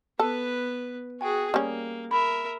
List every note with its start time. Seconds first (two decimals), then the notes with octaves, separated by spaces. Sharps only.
0.19 B3 A4 B4
1.21 F#4 G#4 G5 G#5
1.54 G3 A#3 C#4
2.11 A#4 E5 B5